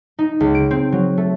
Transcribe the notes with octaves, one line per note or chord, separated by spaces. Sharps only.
D#4
C#2
D7
C4
F#3
A3